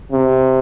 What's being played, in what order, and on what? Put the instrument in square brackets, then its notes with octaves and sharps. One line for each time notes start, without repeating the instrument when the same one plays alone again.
[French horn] C3